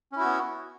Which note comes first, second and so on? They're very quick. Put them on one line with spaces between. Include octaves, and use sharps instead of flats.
C#4 E4 F#4 B3